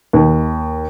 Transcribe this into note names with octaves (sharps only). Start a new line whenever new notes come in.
D#2